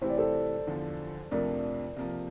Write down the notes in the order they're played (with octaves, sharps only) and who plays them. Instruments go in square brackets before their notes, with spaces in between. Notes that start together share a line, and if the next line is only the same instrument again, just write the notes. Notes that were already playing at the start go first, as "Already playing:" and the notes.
[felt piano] C3 E3 A3 E4 G4 [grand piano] C5
[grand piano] D5
A4 C5
[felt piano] E2 D3 F3
[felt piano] F2 C3 F3 A3 D4 [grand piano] A#4 D5
[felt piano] C3 F3 A#3